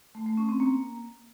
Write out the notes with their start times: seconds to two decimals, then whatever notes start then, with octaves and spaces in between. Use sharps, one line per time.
0.15 A3
0.26 A3
0.37 C#4
0.49 C4
0.60 A#3